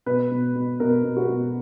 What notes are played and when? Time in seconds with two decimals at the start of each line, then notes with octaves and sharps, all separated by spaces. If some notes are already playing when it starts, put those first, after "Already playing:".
0.06 B2 B4
0.31 B2
0.55 B2
0.80 B2 A#4
1.04 B2
1.17 F#4
1.29 B2